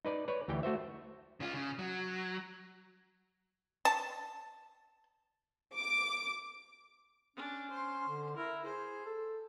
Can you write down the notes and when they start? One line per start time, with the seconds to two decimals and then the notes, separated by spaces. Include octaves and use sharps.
0.05 D#4 B4 D5
0.28 B4 C#5 D5
0.48 D2 E3 G4 G5
0.63 A3 F#4 C5 E5
1.40 C#3 F4
1.54 C#3
1.79 F#3
3.85 A5
5.76 D6
7.36 C#4 D4
7.71 C5 C6
8.08 D3
8.37 E4 A#4
8.65 G#4 C5
9.05 A4